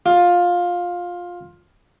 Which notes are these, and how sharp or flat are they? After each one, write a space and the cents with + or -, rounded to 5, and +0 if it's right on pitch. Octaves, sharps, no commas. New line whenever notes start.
F4 +15